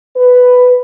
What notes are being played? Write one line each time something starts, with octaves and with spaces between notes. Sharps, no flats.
B4